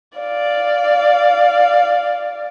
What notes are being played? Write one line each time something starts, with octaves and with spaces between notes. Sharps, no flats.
D5 F5